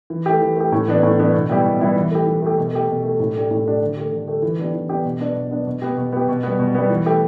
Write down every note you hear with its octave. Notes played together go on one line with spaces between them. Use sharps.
E3
A3 G4
E3
A3 G4
A2
E3 B3 D4
A2
E3 B3 D4
B2
G3 B3 E4 G4
B2
G3 B3 E4 G4
E3
A3 G4
E3
A3 G4
B2
A3 G4
B2
A3 G4
A2
A3 D4 G4
A2
A3 D4 G4
D3
A3 G4
D3
A3 G4
E3
B3 D4 G4
E3
B3 D4 G4
B2
B3 D4
B2
B3 D4
B2
B3 G4
B2
B3 G4
B2
G3 B3
B2
G3 B3
E3
A3 G4